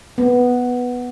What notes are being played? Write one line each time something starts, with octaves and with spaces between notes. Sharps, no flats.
B3